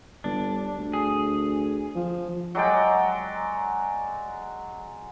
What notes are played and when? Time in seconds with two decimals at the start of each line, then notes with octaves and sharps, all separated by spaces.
0.24 G1 D4
0.78 D2
0.93 G#4
1.95 F3
2.55 F#3 G#3 D5 G5